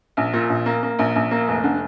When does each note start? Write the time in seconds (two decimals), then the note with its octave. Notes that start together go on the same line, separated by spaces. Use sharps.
0.17 A#1
0.33 A#2
0.49 A#1
0.66 A#3
0.83 A#3
0.99 A#1
1.15 A#1
1.31 A#3
1.48 F1
1.64 D3